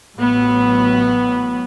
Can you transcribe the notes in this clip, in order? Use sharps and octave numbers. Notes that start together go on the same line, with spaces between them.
A1 A2 F#3 B3